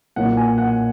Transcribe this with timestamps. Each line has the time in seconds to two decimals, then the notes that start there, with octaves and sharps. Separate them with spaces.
0.16 B1 A#2 A#3 F#5
0.37 G#5
0.58 F#5